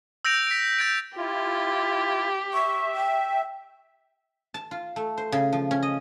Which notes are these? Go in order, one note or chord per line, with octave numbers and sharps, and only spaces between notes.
E6 G6 A#6 D7 F7
B6 D7
G6 A6 D7
E4 F4 G4
E5 C#6
G5
A5
F4
A3
C5
C#3
F3
C#4
D#5